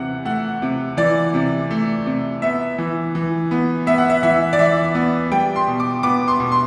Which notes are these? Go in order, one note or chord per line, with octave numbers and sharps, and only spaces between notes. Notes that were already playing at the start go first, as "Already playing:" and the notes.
Already playing: C3 E3 F#5
A3 F#5
C3
E3 D5
C3
A3
C3
B3 E5
E3
E3
B3
B3 E5
F#5
E5
E3 E5
D5
E3 E5
B3
G3 G5
C6
B2
D6
B3 D6
C6
B2
C6